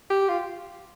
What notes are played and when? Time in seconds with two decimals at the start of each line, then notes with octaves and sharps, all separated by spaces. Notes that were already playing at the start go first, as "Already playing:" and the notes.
0.10 G4
0.29 F4